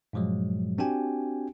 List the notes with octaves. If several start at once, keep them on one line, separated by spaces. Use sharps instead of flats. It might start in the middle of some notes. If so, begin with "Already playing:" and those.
G2 A#2 F3 F#3 G#3
C4 D4 F#4 G4 G5 G#5